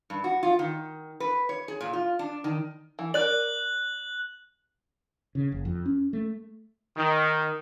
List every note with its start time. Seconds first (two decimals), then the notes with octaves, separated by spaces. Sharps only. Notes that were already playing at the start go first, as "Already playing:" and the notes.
0.10 G2
0.24 F#4
0.43 F4
0.59 D#3
1.20 B4
1.49 C#5
1.68 G#4
1.81 A#2
1.93 F4
2.19 D4
2.44 D#3
2.99 E3
3.14 A#4 D5 F#6 F#7
5.35 C#3
5.52 F#1
5.65 F2
5.86 C#4
6.13 A3
6.96 D#3